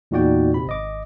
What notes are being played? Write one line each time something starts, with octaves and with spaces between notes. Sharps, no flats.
E2 A#2 D#4 F#4 D5 G5
C3 C4 B5
G#1 D#5 D6